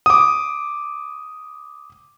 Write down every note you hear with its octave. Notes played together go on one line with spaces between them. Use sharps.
D6 D#6